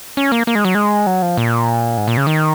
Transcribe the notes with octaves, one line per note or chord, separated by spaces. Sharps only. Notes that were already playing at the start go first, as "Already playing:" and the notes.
C#4
A#3
A#3
G#3
F#3
G#3
F#3
F3
A#2
G#2
A#2
C#3
D#3